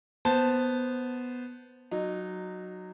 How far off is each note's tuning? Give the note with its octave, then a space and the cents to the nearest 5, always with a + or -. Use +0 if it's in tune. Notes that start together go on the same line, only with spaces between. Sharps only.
B3 +0 C5 -10 A5 +0
F#3 +0 D#4 -20